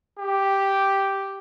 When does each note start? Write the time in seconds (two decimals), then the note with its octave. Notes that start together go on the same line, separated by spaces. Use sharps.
0.19 G4